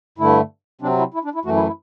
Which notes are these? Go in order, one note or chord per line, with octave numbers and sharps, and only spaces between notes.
G2 D3 A3 E4
C3 F#3 C4 D4
E4
E4
D4
E4
F#2 E3 A3 F#4
E4
E4